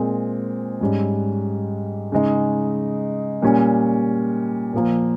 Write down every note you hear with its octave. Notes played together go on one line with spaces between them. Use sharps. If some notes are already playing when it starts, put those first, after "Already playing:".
Already playing: A#2 G#3 C4
G#2 G3 C#4
C#3 G#3 D#4
A#2 G3 C#4
A#2 F3 A#3